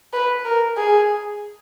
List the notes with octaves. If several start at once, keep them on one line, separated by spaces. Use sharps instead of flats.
B4
A#4
G#4